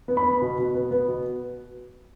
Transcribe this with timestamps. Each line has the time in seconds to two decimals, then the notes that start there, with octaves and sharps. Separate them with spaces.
0.08 B3
0.17 B5
0.25 B3
0.42 B2
0.58 B2
0.74 B3
0.91 B3
1.08 B2